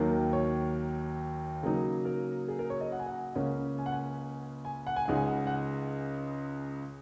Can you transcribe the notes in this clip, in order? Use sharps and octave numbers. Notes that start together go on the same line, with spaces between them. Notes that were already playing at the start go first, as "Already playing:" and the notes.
Already playing: D#2 D#3 F#3 A#3
C#5
C#3 F#3 A#3 D#4
A#4
G#4
A#4
C#5
D#5
F#5
G#5
F#5
C#2 C#3 A#3 C#4
G#5
F#5
G#5
G#5
F#5
G#5
C#2 C#3 G#3 D#4 F#5
G#5
F#5
F#5